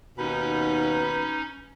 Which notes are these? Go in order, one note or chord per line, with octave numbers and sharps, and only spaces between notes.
D#2 B2 C#4 D#4 B4